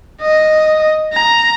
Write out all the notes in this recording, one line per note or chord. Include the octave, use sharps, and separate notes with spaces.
D#5
A#5